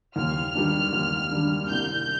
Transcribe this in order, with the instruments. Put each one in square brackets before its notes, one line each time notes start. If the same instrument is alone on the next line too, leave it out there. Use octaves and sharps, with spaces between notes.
[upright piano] D#2 [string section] F6
[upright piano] D#3 G3 D4
D#2
D#3 G3 D4
[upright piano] C2 [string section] G6